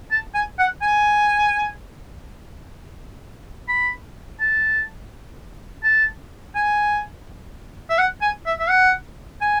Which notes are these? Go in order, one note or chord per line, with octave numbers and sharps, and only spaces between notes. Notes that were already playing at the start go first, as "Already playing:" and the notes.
A5
G#5
F#5
G#5
B5
A5
A5
G#5
E5
F#5
G#5
E5
E5
F#5
G#5